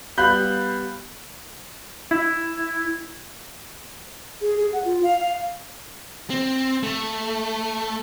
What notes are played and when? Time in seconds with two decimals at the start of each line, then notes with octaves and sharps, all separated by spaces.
0.18 G3 B3 F5 B5 F#6 G6
2.11 E4
4.41 G#4
4.57 G#4
4.73 F#5
4.85 F4
5.03 F5
5.20 F5
6.30 C4
6.83 A3